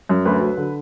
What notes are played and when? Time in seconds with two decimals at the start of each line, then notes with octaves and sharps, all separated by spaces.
0.09 F#2
0.25 D2 B4
0.41 F#3
0.57 D3